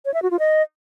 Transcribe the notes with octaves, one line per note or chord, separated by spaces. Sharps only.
C#5
E5
F#4
F4
D#5